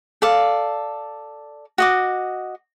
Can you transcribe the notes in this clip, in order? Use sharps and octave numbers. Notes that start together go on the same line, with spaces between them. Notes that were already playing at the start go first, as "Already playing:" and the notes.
A4 D5 F5
F#4 D#5 D6